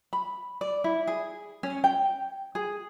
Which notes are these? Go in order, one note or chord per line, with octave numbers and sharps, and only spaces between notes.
B5
D5
E4
G#4
C#4
G5
G#4